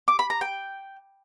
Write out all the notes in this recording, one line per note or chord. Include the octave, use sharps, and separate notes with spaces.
D6
B5
A#5
G5